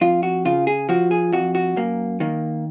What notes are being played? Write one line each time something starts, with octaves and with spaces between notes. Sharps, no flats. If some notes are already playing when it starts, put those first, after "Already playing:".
F2 F4
F#4
C#3 F4
G#4
F3 F#4
G#4
F2 F#4
F#4
F#2 A#3
D#3 A#3